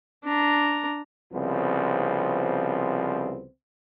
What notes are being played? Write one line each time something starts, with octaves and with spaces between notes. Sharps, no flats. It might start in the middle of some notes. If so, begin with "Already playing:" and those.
D4 A#5
C2 C#3 F3 B3 C4